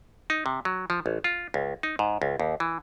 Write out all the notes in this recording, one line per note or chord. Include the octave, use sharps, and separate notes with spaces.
D#4
C3
F#3
F3
A1
F4
C#2
D#4
G#2
C#2
D#2
E3